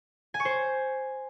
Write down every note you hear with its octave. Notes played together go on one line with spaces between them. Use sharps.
G#5
C#6
C5